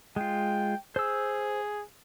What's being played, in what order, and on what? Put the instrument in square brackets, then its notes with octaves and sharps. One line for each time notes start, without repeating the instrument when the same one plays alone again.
[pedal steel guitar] G#3 F4 [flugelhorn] G5
[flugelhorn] G#4 [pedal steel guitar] C5 E6